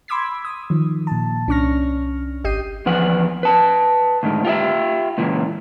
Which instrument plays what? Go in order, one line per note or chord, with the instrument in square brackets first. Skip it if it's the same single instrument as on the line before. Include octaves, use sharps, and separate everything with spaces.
[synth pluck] B5 C6 D6 E6 G#6 B6
D#6
D#3 F3
A#2 A5
C2 C#4 D4 C#6 F6 A#6
G#1 G4 D#5 G6 C7 D#7
[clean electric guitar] E2 F3 B4 F#5
B4 A5
D2 G#2 D#3
F4 G4 D#5 E5
C#2 A#2 E3